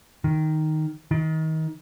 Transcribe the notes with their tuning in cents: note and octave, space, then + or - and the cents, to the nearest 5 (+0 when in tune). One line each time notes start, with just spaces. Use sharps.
D#3 +0
D#3 +25